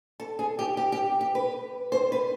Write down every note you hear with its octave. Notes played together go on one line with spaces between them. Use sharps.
A4
G#4
G4
G4
G4
G4
B4
C5
B4